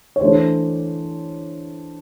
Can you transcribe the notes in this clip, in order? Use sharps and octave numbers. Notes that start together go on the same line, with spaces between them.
C#5
E3 A3 D4 C5